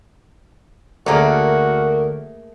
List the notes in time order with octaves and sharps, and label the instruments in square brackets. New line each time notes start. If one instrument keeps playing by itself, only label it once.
[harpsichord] D2 [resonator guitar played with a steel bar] A3 A#3 G#4 [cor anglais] F#4 [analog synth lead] A#4